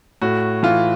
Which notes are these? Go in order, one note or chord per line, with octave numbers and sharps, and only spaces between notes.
A2 F#4
E3 F4